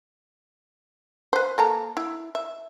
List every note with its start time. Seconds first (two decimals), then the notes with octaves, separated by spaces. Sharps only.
1.33 B4 C5
1.58 A#3 A4 A#5
1.97 E4
2.35 E5